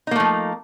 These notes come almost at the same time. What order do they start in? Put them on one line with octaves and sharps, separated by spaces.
D#4 A#3 A3 F3